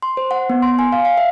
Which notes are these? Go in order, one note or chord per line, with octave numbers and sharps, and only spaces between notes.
C6
C5
F#5
B3
C6
G#5
F5
F5
E5